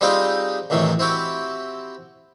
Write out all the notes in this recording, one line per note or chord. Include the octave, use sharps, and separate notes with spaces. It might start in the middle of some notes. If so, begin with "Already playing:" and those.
G3 G#3 C4 D#4 F4 G4
A1 C3 D#3 E3 F#3
C4 E4 F#4 G4